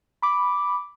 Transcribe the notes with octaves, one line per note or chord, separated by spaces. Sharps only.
B5 D6